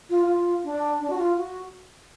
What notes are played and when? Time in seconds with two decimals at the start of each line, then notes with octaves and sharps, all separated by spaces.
0.10 F4
0.28 F4
0.64 D4
1.00 D4
1.10 F#4
1.18 F4
1.37 F#4